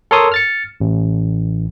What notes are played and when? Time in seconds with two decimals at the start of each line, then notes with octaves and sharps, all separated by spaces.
0.11 A4 A#4 C#5 C6 D#6
0.32 F6 A6 C#7
0.80 A1